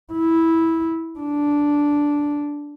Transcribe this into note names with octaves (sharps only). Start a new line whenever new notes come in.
E4
D4